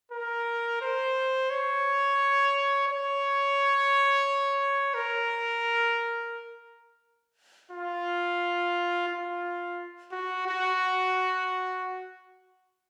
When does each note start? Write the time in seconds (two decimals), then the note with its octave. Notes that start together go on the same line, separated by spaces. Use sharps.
0.12 A#4
0.81 C5
1.50 C#5
2.88 C#5
4.94 A#4
7.71 F4
9.08 F4
10.12 F#4
10.47 F#4